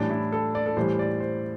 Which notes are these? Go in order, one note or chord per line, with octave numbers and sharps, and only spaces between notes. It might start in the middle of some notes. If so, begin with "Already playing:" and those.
Already playing: A2 E3 G3 D4
E4
A4
D5
A4
A2 E3 G3 C5
D5
C5